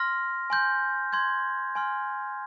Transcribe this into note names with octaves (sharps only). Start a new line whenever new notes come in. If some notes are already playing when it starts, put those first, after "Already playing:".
Already playing: C6 F6 A#6
G#5 C6 G6
C6 G6 G#6
G#5 C6 F6